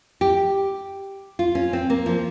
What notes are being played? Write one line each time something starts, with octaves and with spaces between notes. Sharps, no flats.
G4
F4
C#4
C4
A#3
F3